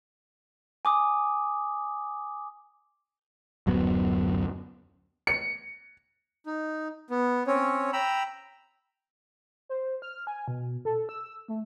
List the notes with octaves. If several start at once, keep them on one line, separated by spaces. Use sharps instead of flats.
G#5 D6 D#6
D1 F#2 F#3 B3
C#7
D#4
B3
C4 C#4 C#5
G5 A#5 B5 E6
C5
F6
G#5
B2
A4
E6
A3